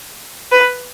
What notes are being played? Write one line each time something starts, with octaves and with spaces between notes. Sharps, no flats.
B4